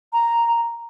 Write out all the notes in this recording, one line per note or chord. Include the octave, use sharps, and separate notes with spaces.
A#5